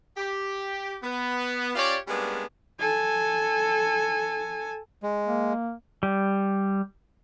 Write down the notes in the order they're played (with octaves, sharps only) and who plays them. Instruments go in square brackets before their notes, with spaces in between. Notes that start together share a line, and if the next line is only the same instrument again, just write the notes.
[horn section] G4
B3
C#4 F4 G4 C#5 D5
G3 G#3 A#3 B3 C#4 D4
[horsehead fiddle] A4 G#5
[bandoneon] G#3
[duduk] A#3
[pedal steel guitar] G3